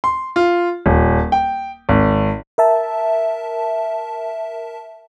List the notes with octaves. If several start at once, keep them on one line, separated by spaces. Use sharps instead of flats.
C6
F4
D#1
G5
G#1
A#4 E5 A5